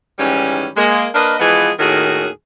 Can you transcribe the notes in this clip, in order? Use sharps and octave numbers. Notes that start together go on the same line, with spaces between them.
G#2 D#3 E3 G3 C#4
G#3 A#3
A#3 D4 A#4 B4 D#5
E3 F3 G#3 B3 F4 G#4
D#2 A2 D#3 C#4 F#4 G#4